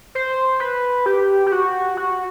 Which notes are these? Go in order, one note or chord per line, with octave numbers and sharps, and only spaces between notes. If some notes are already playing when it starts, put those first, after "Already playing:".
C5
B4
G4
G4
F#4
F#4